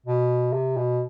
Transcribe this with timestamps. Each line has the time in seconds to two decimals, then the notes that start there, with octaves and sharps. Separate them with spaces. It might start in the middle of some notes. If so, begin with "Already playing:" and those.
0.07 B2
0.53 C3
0.77 B2